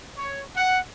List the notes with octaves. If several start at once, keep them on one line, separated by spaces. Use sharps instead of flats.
C#5
F#5